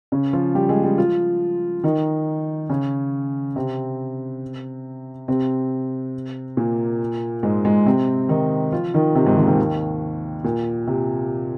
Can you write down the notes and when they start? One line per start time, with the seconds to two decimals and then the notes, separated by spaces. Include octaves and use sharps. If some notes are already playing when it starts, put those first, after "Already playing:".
0.12 C#3 C#4
0.33 F3 F4
0.55 G3 G4
0.69 G#3 G#4
0.83 G3 G4
0.98 F3 F4
1.84 D#3 D#4
2.69 C#3 C#4
3.56 C3 C4
5.28 C3 C4
6.57 A#2 A#3
7.43 G#2 G#3
7.65 G#2 G#3
7.86 C3 C4
8.29 D#3 D#4
8.72 F3 F4
8.94 D#3 D#4
9.15 C3 C4
9.25 G#2 G#3
9.36 D#2 D#3
9.48 D#2 D#3
10.44 A#2
10.87 C3